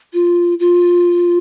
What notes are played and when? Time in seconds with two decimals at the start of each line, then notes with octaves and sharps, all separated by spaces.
0.13 F4
0.60 F4